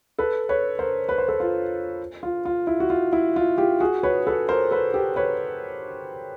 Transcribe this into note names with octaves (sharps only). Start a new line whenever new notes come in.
A4 B4
B4 C#5
A#4 C5
B4
C5
A4 B4
F4
F4
F4
E4
F#4
F4
E4
F4
F4 G4
F#4 G#4
B4 C#5
A4 B4
A#4 C5
A4 B4
G4 A4
B4 C#5